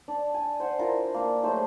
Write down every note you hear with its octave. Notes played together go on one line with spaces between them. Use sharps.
D4
G#5
C5 F#5
D4 E4 F4 A#4
A#3 D4
F#3 A3 G#4 C5